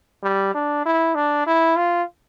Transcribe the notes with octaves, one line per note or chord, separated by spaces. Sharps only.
G3
D4
E4
D4
E4
F4